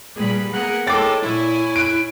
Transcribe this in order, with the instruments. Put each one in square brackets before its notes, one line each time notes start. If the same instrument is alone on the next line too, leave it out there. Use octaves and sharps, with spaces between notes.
[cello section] A#2 G3 B4 [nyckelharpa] G#4 B5
[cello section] A#3 B3 A#4 [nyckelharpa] G#4 F#5
[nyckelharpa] G#3 A4 [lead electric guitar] C#5 G5 [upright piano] D6 A6
[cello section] A#2 [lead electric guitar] E4 [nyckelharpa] C#5 G#5
[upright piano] F#6 D7